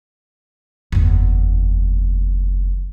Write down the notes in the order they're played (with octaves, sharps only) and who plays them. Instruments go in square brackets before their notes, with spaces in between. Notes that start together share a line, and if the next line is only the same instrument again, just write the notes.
[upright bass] F#1 E2